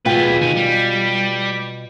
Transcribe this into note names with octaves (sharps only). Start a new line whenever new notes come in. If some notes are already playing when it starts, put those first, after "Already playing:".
B2 F4 G#4 B4 G5
D#3 G#5
G3